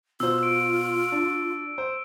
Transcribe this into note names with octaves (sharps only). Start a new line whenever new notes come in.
B2 F4 C5 E6
E6 D7
D4
C5